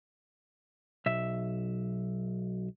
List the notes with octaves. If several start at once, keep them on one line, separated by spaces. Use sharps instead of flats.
B1 E5